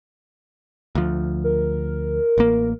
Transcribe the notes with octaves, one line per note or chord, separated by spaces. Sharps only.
D2 F3
A#4
A1 A#3